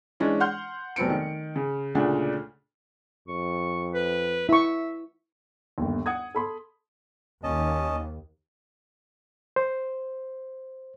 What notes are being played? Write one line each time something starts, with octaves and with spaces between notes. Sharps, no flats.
E3 G#3 C#4 D4
F#5 C6 F6 G6
F1 F#3 B3 C4 C#7 D7
D#3
C#3
D2 A#2 C#3 D4
F2 C#6
B4
E4 E5 C#6
G1 D#2
F#5 D#6 G#6
A4 B5 C6
D#2 C#4 D#5 A5
C5